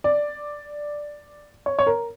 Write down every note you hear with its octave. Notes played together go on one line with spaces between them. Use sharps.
D5
C#5
C#5
A#4